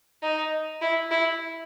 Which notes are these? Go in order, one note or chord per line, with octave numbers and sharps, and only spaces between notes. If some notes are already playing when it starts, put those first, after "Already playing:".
D#4
E4
E4